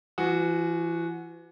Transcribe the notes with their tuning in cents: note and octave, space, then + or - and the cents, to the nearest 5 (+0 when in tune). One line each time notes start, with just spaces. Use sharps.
E3 +35 F#4 -10